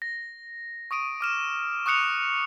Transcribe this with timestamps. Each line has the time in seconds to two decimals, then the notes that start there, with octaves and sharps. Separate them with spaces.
0.02 A#6
0.91 C#6 D#6 D7 D#7
1.21 D6 F6 E7
1.86 C#6 D#6 F#6 C#7 F7